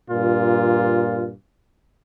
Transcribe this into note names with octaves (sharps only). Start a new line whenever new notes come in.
G2 A#2 F4